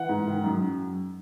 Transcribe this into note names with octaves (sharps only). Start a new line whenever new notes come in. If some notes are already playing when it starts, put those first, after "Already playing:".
Already playing: E3 F#5
G#2
D#3
F#2